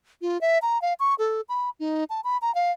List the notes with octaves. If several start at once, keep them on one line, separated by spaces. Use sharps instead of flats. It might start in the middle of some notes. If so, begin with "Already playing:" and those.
F4
E5
A#5
F5
C#6
A4
B5
D#4
A5
B5
A#5
F5